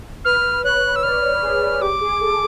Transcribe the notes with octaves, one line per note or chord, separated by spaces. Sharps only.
B4 F6
C#5 F#6
E6
D5 F6
G#4
G4 D6
G#4
A4